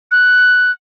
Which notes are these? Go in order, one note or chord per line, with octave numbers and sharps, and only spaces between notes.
F#6